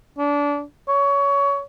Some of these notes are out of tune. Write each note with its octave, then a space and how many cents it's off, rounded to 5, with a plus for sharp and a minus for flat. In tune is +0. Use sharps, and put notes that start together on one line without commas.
D4 -25
C#5 +20